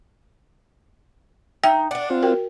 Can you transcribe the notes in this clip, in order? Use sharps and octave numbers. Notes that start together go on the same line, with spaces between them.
D#4 E5 G5
D4 D5 F#5
C4 F4
F#4 A#4 G5